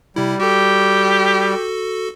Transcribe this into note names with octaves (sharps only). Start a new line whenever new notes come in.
C3 G3 E4
F#4 G4 A4